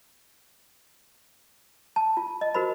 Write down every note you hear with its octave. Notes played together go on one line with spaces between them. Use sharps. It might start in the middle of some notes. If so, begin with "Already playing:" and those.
A5
F4
D#5
F#4 A#4 C5 B5